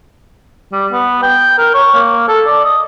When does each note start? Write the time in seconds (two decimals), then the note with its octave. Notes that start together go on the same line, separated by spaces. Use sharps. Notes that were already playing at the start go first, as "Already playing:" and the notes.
0.72 G3
0.92 B3
1.23 G5
1.58 A#4
1.74 C#5
1.94 A#3
2.28 A4
2.47 D5
2.64 D#5